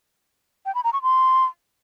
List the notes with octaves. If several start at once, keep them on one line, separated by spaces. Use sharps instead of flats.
G5
B5
A#5
C#6
C6